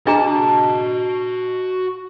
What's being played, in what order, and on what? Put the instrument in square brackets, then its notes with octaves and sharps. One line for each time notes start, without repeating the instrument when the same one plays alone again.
[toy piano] D4 G#4 A#5 [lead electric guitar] F#4 D#5 [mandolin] A5